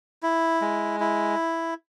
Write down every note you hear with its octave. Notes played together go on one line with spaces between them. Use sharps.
E4
G#3
E4